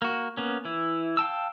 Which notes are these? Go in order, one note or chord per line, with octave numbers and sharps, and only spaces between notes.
A#3 F#4
A#3 B3 C#4
E3 E4
F5 G5 A5 E6